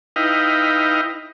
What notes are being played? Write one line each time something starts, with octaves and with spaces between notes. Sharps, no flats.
D#4 E4 B4 D#5 F5 G5